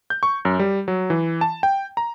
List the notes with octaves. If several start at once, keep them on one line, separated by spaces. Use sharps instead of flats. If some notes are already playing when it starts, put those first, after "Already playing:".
G6
C#6
F#2
G3
F#3
E3
A5
G5
A#5